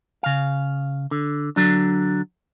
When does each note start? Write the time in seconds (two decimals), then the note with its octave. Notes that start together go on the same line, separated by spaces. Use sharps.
0.23 C#3 F5
1.11 D3
1.56 D3 F#3 D4